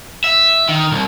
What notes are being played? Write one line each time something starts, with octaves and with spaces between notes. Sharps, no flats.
E5
D#3
C2